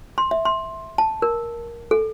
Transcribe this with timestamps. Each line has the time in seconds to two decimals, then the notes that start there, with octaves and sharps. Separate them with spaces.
0.18 C6
0.31 E5
0.45 C6
0.98 A5
1.22 A#4
1.91 A4